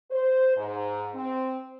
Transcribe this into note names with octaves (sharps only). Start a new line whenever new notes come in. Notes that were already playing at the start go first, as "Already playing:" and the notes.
C5
G#2
C4